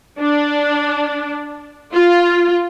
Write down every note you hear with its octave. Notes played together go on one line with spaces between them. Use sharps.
D4
F4